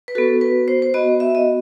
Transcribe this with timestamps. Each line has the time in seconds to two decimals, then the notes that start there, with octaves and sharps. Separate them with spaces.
0.08 B4
0.15 B3 F#4 A4
0.41 B4
0.68 C5
0.82 C5
0.94 B3 F#4 D#5
1.20 E5
1.35 D#5